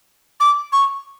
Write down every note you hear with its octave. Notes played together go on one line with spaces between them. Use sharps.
D6
C#6